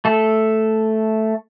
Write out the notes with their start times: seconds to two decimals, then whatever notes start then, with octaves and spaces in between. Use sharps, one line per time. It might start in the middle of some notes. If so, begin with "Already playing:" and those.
0.05 A3 A4